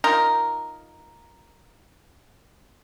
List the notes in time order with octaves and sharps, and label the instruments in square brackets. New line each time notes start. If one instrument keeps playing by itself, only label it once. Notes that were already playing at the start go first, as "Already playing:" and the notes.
[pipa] D#4 F4 A#4